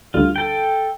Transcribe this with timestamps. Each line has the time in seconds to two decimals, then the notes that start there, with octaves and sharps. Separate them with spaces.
0.14 D2 D3 G3 F4
0.36 A4 G5